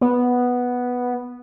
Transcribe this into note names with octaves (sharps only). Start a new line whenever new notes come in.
B3